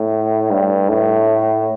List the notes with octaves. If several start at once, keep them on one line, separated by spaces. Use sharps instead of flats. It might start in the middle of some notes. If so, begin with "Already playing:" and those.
Already playing: A2
G2
A2